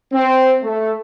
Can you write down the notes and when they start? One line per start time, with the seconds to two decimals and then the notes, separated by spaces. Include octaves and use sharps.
0.13 C4
0.63 A3